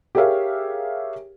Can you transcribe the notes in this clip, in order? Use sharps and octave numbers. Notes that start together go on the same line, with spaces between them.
G4 G#4 A#4 C#5 E5 F5